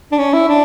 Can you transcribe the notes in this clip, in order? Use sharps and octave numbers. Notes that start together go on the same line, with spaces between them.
D4
C#4
E4
D4